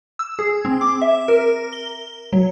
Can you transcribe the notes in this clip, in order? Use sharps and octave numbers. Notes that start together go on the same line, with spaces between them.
E6
G#4
C4
D6
E5
A#4
G7
F#3